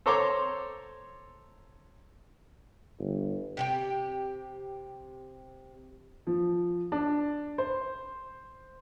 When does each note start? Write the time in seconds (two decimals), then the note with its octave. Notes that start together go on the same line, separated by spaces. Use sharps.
0.06 A4 C5 C#5 A#5 C6 D6
2.99 G1
3.57 C3 G4 G5
6.27 F3
6.92 D4
7.58 C5